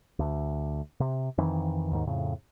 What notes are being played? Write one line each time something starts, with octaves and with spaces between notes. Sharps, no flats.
D2
C3
F2 D#3 E3
D#2 G#2 D#3
F2 A2 C#3